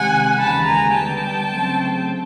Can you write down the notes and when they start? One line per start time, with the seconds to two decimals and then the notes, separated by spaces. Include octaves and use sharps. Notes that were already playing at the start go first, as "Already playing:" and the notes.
Already playing: C3 D#3 G#3 F#5 G#5
0.38 D#2 C#3 E3 G#3 A5 B5
0.66 G#5 A#5
0.94 D3 G3 B3 G5 A5
1.51 C#3 F#3 A3 C4